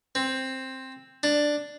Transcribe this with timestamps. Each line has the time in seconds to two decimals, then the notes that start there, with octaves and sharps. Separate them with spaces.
0.15 C4
1.23 D4